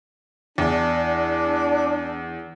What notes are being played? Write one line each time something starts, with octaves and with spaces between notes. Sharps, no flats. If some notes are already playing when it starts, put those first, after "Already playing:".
E2 D4